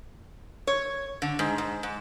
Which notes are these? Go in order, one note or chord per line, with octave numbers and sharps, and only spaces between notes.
C#5
D3
G#2
G#2
G#2